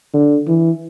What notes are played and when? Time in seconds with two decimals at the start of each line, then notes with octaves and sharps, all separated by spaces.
0.14 D3
0.47 E3